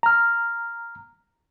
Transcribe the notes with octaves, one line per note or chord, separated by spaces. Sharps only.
A#5 F6